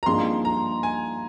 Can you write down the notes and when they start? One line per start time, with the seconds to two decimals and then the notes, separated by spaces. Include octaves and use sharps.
0.03 A#5
0.06 G2 F3 A#3 D#4 G#4 C6
0.45 A#5
0.83 G#5